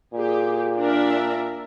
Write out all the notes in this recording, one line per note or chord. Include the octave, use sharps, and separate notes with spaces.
A#2 G4 G#4
D4 A#4 E5